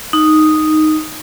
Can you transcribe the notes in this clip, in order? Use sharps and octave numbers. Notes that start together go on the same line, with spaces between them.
D#4